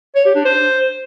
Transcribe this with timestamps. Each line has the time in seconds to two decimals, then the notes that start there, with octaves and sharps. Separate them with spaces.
0.15 C#5
0.25 G4
0.35 D4
0.45 C5